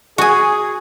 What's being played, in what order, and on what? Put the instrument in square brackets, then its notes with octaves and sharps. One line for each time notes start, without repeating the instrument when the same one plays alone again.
[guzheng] F#4 G#5 [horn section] G#4